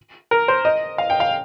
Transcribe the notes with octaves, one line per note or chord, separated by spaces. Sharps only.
A#4
C5
D#5
F5
G5
F5